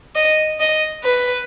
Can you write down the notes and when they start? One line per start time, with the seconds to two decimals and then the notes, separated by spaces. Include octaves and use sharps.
0.16 D#5
0.60 D#5
1.04 B4